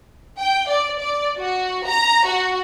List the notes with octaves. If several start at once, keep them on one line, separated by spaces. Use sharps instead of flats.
G5
D5
D5
F#4
A#5
F#4